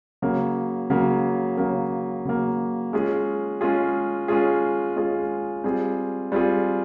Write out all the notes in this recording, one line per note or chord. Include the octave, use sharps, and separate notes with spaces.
C#3 F#3 A#3
C#3 F#3 A#3
C#3 F#3 A#3
C#3 F#3 A#3
G#3 C#4 F4 G#4
G#3 C#4 F4 G#4
G#3 C#4 F4 G#4
G#3 C#4 F4 G#4
G3 C4 F4 G#4
G3 C4 F4 G#4